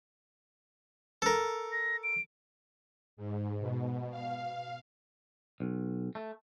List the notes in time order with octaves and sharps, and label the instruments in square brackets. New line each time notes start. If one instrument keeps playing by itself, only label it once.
[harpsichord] A4 A#4
[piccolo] A#6
D7
[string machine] G#2
B2
F5
[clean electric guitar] B1
A3